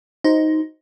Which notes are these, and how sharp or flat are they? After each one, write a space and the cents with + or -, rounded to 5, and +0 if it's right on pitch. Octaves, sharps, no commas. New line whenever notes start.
D#4 +10 F#4 +5 C5 +0